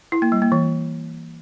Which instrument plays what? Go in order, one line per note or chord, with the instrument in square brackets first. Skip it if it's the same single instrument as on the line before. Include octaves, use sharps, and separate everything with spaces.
[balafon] E4
A#3
G3
A#3
E3